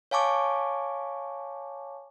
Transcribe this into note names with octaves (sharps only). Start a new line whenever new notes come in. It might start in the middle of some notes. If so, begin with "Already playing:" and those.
C#5 F5 G#5 A5 C#6 D6